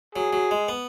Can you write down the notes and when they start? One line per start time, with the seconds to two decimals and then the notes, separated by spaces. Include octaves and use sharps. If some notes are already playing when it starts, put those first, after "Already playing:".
0.15 F#3 G#4
0.33 F#3
0.51 G#3
0.68 B3